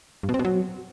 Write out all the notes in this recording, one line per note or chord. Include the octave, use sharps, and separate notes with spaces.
G2
B2
C4
B2
F#3